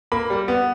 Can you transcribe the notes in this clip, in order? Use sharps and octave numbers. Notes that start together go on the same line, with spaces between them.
A#3 B5
G3
B3